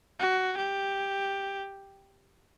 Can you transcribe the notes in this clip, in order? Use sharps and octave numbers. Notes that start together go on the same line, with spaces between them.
F#4
G4